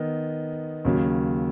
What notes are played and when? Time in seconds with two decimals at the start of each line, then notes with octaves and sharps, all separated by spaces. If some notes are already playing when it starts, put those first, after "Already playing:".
Already playing: D#3 B3 D#5
0.85 D#2 C#3 F#3